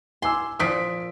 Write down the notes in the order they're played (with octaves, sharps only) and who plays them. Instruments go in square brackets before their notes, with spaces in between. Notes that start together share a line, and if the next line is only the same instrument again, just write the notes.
[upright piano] G#5 D6 E6 [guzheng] C6
[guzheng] A#2 F3 [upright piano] D#6 B6 D7